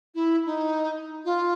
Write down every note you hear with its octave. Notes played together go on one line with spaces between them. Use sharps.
E4
D#4
F4